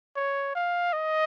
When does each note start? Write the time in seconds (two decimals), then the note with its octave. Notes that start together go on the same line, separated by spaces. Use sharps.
0.16 C#5
0.55 F5
0.93 D#5